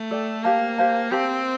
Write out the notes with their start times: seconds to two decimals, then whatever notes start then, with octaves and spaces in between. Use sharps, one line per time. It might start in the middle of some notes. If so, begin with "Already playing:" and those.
Already playing: A3
0.11 A4 D5 G5
0.44 A#3 G4 C5 F5 A5
0.78 G4 C5 F5 A5
1.11 C4 G4 C5 F5 A5